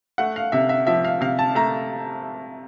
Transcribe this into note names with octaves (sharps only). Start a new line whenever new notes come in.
A3 F#5
F5
C3 E5
E5
F3 E5
F5
C3 F5
A5
A3 A#5